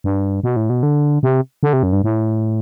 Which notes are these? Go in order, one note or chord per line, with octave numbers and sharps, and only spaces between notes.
G2
B2
A2
B2
D3
C3
D3
C3
F#2
G2
A2